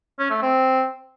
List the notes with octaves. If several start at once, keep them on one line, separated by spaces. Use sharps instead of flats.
C#4
A3
C4